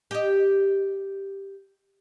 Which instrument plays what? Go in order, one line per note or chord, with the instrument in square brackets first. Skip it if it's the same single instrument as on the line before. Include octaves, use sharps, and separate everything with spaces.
[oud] G4 D#5